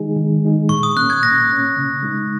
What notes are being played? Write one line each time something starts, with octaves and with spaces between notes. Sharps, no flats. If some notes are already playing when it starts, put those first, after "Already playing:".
Already playing: D#3 G#3 D#4 G#4
D#3
G#3 D#4 G#4
A#2 C#6
D#6
A#3 C#4 F#6
G#6
A#2 A#6
A#3 C#4
C#3
G#3 D#4